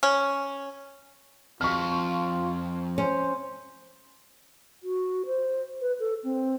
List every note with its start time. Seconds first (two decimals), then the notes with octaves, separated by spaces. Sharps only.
0.03 C#4
1.61 F2 F4 C#6 F6
2.98 C#4 C5
4.83 F#4
5.26 C5
5.81 B4
6.00 A4
6.24 C4